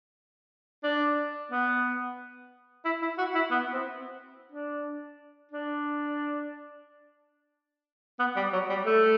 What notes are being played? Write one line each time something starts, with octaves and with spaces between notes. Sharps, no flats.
D4
B3
E4
E4
F#4
E4
B3
C4
D4
D4
B3
G3
F#3
G3
A3